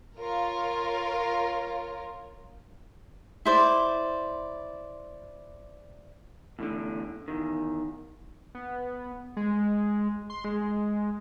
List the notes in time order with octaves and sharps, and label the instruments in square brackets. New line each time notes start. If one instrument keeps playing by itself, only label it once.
[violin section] F4 A#4 C#5
[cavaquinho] E4 C5 D5
[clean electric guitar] E2 A2 D3
E2 D#3
[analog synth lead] B3
G#3
C6
G#3